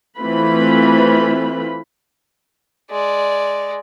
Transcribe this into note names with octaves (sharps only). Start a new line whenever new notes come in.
E3 A3 C4 F4 B4 B5
G#3 D5